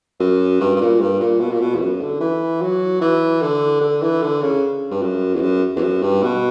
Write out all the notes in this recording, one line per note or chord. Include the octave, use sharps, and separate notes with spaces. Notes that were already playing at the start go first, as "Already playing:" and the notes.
F#2
G2
G2
A#2
G2
A#2
B2
A#2
B2
E2
F#2
D3
E3
F#3
E3
D3
D3
E3
D3
C#3
G2
F#2
E2
F#2
E2
F#2
G2
B2